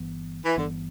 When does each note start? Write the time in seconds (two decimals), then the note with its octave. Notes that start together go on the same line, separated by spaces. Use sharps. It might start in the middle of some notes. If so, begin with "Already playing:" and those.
Already playing: G1 G2 E3 B3
0.45 E3
0.56 G1 G2 D3 E3 B3